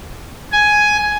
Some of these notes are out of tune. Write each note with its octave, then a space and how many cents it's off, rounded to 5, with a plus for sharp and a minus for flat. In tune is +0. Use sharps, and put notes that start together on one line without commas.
G#5 +10